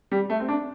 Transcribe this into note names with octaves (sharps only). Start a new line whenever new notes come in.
G3
A3
C4
D4